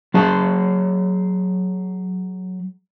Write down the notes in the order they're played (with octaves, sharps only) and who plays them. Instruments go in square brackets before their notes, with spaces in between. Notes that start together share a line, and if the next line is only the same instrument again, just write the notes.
[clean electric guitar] F#3 G#4 A5